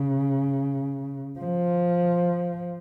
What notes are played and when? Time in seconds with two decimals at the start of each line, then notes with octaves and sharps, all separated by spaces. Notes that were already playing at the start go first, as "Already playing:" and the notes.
Already playing: C#3
1.39 F3